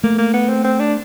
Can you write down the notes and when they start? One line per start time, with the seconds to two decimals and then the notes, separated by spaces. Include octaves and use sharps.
0.03 A3 A#3
0.18 A#3
0.33 B3
0.49 C4
0.64 C4
0.79 D4